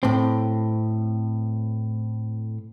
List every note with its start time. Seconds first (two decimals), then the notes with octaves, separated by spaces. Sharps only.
0.03 A2 C4